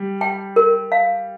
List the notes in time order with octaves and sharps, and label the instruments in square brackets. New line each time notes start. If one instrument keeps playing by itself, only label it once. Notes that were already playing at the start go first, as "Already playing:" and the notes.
Already playing: [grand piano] G3
[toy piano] G5
A#4
F5